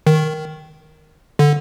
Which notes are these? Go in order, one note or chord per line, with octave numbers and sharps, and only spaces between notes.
D#3
D3